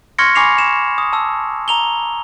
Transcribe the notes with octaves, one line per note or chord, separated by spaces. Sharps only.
C6 C#6 F6 G#6 A#6 C#7
G#5 B5 C#6 D6 C7 F7
E7
D#6
A5 E6
A#5 F7 G7